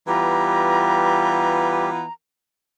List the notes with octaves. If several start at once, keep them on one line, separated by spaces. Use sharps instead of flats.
E3 G3 B3 F4 G4 A#5